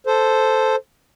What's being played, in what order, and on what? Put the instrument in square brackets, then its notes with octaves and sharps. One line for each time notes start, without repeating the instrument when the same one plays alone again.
[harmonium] A4 C5